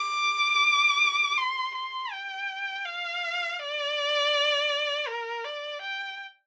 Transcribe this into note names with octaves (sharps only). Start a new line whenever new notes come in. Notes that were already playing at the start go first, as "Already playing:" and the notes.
Already playing: D6
C6
C6
G5
F5
D5
A#4
D5
G5